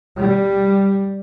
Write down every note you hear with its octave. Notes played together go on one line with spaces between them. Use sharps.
G3